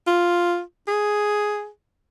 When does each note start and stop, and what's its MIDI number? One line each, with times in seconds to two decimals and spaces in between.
0.07 0.60 65
0.88 1.68 68